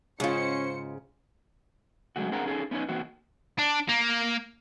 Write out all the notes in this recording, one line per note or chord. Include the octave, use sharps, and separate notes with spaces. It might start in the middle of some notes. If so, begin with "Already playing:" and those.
G#2 C#3 G#3 C#4 F4 C5 C#7
C#3 F#3 G#3 A3 F#4
C4 D4 G#4 A#4 F#5 A#5
C#4 D#4 G#4 A4
B3 C#4 D#4 B4 C#5
E3 A#3 C4 F#4
D4
A#3